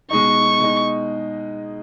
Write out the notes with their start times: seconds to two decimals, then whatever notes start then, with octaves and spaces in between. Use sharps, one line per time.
0.11 B2 G#3 D#4 C#6
0.60 B2 G#3 D#4